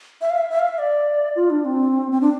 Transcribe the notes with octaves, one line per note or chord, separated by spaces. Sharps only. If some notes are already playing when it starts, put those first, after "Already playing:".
E5
F5
E5
E5
F5
E5
D5
F4
D4
C4
C4
D4